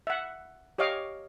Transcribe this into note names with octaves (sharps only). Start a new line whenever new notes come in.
E5 F#5
G4 C#5 D#5 F5 D6